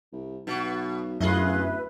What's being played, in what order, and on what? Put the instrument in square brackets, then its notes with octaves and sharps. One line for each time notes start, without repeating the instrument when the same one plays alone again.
[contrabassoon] C2
[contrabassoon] B1 [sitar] B2 F#4
[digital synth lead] F#2 [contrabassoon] A2 [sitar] F4 G#4 D#5 [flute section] B4 E5
[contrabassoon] D1